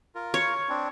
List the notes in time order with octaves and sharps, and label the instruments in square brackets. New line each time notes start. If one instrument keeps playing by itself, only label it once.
[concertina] F4 A#4
[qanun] C#5
[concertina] C4 D4